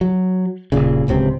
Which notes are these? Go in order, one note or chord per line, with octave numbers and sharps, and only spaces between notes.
F#3
D#1 C2 A#2 C#3
D1 C#2 C3 C4